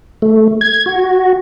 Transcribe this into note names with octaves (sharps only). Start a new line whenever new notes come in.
A3
G#6
F#4